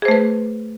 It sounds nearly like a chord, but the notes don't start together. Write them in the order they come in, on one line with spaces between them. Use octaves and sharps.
G#4 C5 A3 B4